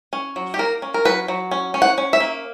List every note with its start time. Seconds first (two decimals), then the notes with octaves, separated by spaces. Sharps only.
0.13 C#4
0.36 F#3
0.54 G4
0.59 A#3 A#4
0.82 C#4
0.94 A#4
1.05 F#3 B4
1.28 F#3
1.51 C#4
1.74 C#4
1.82 F#5
1.98 C#4
2.13 E5
2.20 A#3